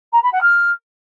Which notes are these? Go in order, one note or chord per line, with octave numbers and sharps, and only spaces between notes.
A#5
B5
F#5
F6